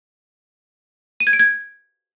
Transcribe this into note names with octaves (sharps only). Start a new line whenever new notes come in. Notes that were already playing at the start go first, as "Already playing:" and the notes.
D#7
G#6
D7
G#6